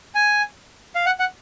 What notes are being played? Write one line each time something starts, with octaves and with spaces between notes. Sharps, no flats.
G#5
F5
F#5
F#5